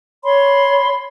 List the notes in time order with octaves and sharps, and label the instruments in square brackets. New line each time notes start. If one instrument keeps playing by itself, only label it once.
[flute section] C#5 B5 C6